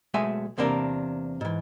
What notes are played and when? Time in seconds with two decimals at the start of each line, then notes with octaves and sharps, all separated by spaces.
0.14 B1 G#3 A3 E5 G#5 C6
0.58 E2 C3 A#3 D4 E4 A#4
1.41 G#2 E3